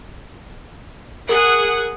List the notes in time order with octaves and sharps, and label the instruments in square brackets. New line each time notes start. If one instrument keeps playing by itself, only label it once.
[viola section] G#4 F#5 [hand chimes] A#4